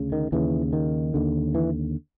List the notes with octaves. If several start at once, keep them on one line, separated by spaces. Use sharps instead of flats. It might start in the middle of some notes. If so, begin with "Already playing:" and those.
Already playing: D2 C#3
D#3
D#2 C#3 E3
D#3
D#2 D3
E3